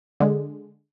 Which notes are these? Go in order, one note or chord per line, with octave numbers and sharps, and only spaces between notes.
D3 G#3